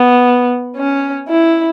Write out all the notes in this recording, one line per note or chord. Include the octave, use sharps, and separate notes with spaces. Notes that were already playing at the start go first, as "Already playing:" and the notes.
Already playing: B3
C#4
E4